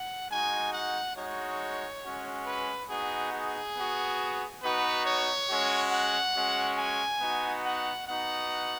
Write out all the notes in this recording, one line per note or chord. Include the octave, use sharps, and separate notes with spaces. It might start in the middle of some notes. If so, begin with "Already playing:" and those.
Already playing: F#5
G#3 D#4 F#4 G#5
F#5
G#3 D#4 F#4 C#5
G#3 C#4 F#4
B4
B3 D#4 F#4 G#4
G#4
B3 F#4
B3 D#4 F#4 B4
C#5
G#3 C#4 F#4
F#5
G#3 C#4 F#4
G#5
B3 D#4 F#4
F#5
B3 D#4 F#4 F#5